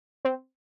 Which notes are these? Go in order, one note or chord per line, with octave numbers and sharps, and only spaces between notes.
C4